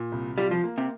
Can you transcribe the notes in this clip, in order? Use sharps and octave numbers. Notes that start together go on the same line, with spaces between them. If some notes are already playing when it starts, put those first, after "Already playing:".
Already playing: A#2
C2
G3 F4
F3
A#3
C3